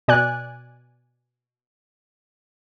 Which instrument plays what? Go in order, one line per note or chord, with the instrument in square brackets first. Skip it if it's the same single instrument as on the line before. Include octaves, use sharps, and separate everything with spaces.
[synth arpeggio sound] B2 D5 G#5 F#6